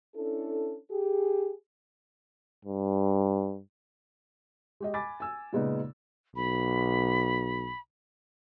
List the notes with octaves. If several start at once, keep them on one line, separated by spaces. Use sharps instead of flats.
C#4 D4 E4 A4
G4 G#4
G2
G#3 G4 D#5
G#5 B5 D6 A6
G#5 E6
A#2 C#3 G#3 B3 D#4
B1 B5